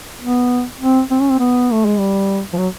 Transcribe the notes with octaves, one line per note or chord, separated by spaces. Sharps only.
B3
C4
C4
C#4
C4
B3
A3
G#3
G3
F3
F#3